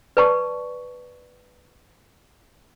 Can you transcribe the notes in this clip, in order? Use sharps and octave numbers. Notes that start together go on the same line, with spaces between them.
B4 D5 A5 C#6